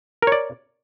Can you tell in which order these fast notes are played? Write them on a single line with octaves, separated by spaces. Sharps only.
A#4 C#5 D5